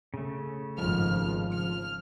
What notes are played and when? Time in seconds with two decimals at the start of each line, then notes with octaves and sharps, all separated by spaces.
0.14 C#3 A3
0.77 G#1 F3 F6
1.51 F6